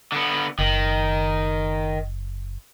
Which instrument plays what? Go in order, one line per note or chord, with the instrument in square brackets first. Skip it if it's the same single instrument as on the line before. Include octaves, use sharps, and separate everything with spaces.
[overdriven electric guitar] D3 B3
[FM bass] F#1 [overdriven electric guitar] D#3